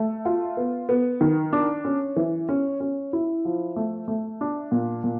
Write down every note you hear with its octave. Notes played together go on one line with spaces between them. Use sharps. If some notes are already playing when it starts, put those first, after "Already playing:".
Already playing: A3
F4
B3
B3
D#3
D4
C#4
E3
C#4
C#4
E4
F3
A3
A3
D4
A#2
A#2